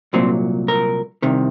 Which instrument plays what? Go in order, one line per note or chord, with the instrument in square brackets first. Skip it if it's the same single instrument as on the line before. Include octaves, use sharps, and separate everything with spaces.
[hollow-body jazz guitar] C2 A#2 F#3 C4
A#4
C2 C3 D#3